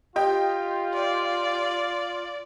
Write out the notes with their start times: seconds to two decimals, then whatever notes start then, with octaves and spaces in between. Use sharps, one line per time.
0.16 F4 G4 D#5 G5
0.94 D5